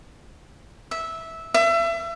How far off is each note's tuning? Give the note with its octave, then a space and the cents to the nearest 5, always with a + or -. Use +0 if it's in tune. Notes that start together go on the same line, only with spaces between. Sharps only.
E5 -10
E5 +30